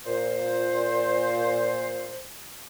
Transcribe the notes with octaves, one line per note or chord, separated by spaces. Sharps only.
A#2 C5